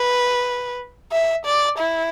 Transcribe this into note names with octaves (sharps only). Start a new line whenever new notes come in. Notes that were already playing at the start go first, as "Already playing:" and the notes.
Already playing: B4
E5
D5
E4